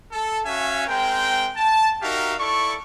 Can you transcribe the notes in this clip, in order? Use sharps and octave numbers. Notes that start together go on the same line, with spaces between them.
A4
C#4 F#4 E5 F5 G#5
G#3 C4 A#4 G5
A5
D#4 F#4 G4 A#4 E5 F5
E4 A4 D5 C#6